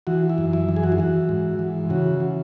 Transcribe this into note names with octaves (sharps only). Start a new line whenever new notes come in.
E3 F#4
E4
F#2
E4
E3
G#4
F#4
E4
E3 F#4
G#2
E3
C#3 F#4
E3